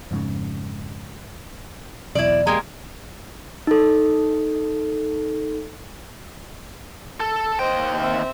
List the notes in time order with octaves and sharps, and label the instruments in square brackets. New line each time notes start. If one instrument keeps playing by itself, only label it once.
[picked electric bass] F2 G#2 C#3
[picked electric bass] B1 E2 B2 [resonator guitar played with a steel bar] E4 D5
[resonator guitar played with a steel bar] G#3 A#3 G4
[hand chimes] D#4 A4
[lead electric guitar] A4
[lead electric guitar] D#2 G5 [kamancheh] C5 D#5
[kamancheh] C4 E5